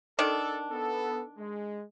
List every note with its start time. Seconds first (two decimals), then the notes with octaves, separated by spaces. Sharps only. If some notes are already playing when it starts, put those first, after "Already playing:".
0.19 D#3 D4 A4
0.71 B3 A4
1.38 G#3